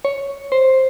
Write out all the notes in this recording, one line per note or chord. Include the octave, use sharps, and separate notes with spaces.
C#5
C5